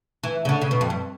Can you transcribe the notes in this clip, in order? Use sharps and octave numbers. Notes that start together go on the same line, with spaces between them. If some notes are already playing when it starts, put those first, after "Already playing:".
E3
C#3
D3
C#3
B2
F2
G2